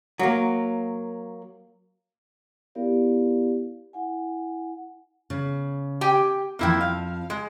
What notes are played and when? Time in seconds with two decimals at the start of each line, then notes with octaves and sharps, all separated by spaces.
0.19 F#3 A#3
2.75 B3 E4 G4 A#4 D5 F5
3.93 E4 F#5 G#5
5.30 C#3
6.01 G4 G5 G#5
6.59 F2 F3 A#3 E4 G5
6.81 F5
7.30 G#3